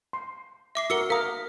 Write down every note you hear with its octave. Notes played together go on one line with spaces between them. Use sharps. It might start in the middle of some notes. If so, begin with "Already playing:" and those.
C6
E5 D6 C7
F#4 A#4 E6 C#7 G7
A#4 F5 A#5 D#6